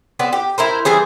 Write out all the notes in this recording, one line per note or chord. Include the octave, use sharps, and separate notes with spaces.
B3 C4 D5
G4
E4 A#4 C5
E3 G3 G#4 C5